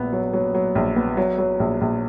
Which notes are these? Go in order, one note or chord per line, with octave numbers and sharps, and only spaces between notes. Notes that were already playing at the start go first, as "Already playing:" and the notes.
Already playing: A#1 A#2 B3
F#3
F#3
F#3
A#1
B3
F#3
F#3
A#1
A#1